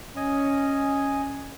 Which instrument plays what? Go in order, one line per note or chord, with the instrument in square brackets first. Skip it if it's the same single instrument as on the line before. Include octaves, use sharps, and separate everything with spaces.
[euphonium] C#4 [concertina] D#5 G#5